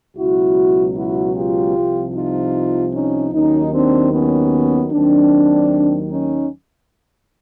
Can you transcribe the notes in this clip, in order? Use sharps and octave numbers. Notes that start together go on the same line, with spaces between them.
C#2 B2 F#3 E4 F#4
E4 F#4
F4 G4
C2 C3 F3
D#4 F4
C#4 D#4
D#2 D#3 F#3 C#4 D#4
C4 D4
B3 C#4
D#2 D#3 F#3 C4 D4
C#4 D#4